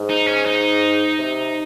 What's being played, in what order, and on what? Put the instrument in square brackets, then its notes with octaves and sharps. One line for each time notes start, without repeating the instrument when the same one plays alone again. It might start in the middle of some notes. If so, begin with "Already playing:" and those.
Already playing: [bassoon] G#2
[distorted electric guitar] D#4
C#4
D#4
[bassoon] C3